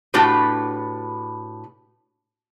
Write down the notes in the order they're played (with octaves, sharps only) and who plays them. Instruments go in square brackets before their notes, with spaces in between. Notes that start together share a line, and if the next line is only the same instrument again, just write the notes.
[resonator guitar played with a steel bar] A2 D4 F#4 G4 B4